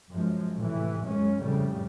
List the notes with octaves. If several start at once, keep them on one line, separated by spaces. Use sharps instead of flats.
F#2 F3 G#3
A2 C3 E3
F#2 G#3 C#4
F2 A2 C#3 G3